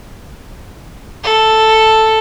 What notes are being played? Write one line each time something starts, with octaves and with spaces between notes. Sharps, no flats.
A4